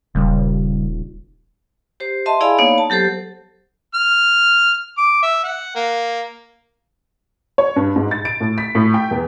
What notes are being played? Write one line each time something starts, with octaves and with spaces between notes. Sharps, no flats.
D#1 C#3 G3
G4 C5
D#5 E5 A5 C6
E4 G#4 D5 F5 G#5 B5
A#3 B3 D#4 C#5 F5
A5
F#3 G4 A4 C5
F6
D6
E5
F#5
A#3
C#5
G2
G#2
A6
D7
A2
B6
A2
G5
E2